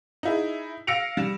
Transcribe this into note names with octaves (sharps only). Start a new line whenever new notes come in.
D#4 E4 G#4
F5 E6 A#6 C#7 D7 F7
G3 E7